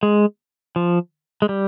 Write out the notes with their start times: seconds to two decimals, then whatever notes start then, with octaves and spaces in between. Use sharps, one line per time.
0.03 G#3
0.76 F3
1.42 G#3
1.49 G3